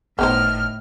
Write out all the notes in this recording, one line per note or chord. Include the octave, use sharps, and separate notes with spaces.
G1 A2 B3 D#4 C5 F6